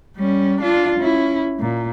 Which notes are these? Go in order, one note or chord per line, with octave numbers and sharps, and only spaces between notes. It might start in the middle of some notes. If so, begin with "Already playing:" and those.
G3 C#4
D4 F4
C#4 E4
A#2